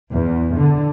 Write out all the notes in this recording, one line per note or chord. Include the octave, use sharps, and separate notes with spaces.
E2
D3